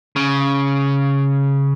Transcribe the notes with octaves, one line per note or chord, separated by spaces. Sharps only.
C#3